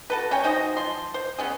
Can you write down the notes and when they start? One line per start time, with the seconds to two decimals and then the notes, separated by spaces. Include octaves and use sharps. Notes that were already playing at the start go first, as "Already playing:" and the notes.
0.10 F#4 A4 B4
0.31 C#4 C#5 G5 G#5
0.43 F#3 D#4 C5 D#5
0.77 F3 C6
1.14 C5
1.38 B3 C#4 G#4